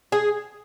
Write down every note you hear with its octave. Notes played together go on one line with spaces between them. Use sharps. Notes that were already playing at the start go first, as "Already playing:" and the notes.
G#4